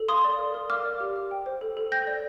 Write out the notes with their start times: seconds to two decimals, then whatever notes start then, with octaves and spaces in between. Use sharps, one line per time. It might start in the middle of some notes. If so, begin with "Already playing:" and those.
Already playing: A4
0.09 F5 C6 D#6
0.24 D5
0.39 A#4
0.54 A#4
0.70 F5 D6 F6
0.85 D5
1.00 G4
1.16 G4
1.31 G5
1.46 C5
1.61 A4
1.77 A4
1.92 G5 G6 A#6
2.07 D5